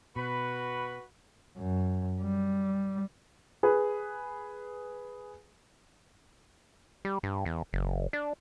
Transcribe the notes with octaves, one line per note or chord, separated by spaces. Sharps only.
B2 F#4 B4 B5
F#2
G3
G#4 B4
G3
G2
E2
F#1
D4